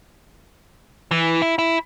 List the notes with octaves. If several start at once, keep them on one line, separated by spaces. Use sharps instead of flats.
E3
E4
E4